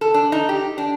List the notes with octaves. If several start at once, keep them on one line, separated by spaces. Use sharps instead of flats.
A4
D4
D#4
G4
D4